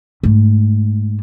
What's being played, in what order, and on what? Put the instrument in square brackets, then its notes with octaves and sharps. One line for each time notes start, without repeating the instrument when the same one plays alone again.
[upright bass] G#2 A3